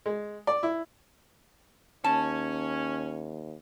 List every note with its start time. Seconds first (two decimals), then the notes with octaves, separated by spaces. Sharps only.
0.06 G#3
0.47 D5
0.63 E4
2.04 D#2 C#4 A5